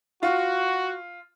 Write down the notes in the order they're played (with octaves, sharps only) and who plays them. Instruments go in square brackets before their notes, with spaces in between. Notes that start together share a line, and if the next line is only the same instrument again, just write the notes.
[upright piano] F4 [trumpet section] F#4